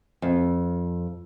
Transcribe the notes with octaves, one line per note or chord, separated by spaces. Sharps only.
F2